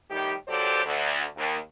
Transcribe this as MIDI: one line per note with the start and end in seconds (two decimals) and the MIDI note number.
0.11 0.33 45
0.11 0.33 51
0.11 0.33 55
0.11 0.33 67
0.48 0.84 39
0.48 0.84 54
0.48 0.84 67
0.48 0.84 69
0.48 0.84 72
0.48 0.84 74
0.85 1.24 38
1.37 1.57 39